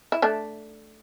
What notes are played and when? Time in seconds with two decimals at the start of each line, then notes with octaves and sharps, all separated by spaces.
0.12 E4
0.22 A3 D4